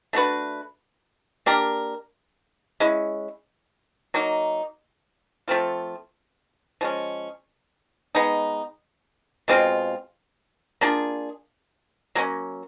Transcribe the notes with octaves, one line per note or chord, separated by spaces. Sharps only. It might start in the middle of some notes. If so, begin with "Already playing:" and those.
A3 D4 F#4 B4
A#3 D4 G4 A#4
G#3 C#4 E4
F#3 A#3 D#4
F3 A3 C4 F4
F3 G#3 C#4
G#3 B3 D#4
B2 G#3 C4 F4
A#3 D4 F4 G#4
F#3 A#3 C#4